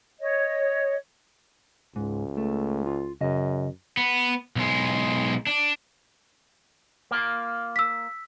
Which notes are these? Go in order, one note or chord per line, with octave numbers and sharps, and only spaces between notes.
C#5 D#5
C#2 G#2
A3
F4
F#2 C#3 D#5
B3
B1 G#3
D4
A#3 F4
E6 B6